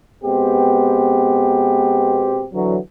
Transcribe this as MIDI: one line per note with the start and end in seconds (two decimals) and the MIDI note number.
0.24 2.45 47
0.24 2.45 56
0.24 2.45 59
0.24 2.45 60
0.24 2.45 67
2.53 2.77 50
2.53 2.77 52
2.53 2.77 54